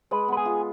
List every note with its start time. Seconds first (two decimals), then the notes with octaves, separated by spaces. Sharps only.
0.11 G#3 B4
0.28 B3 B4
0.37 G#4
0.45 F4